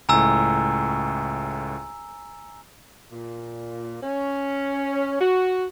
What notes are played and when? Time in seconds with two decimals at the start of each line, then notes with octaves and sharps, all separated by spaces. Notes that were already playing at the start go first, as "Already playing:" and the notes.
0.09 C#2 A2 G#5 A#5 E6
3.12 A#2
4.03 C#4
5.20 F#4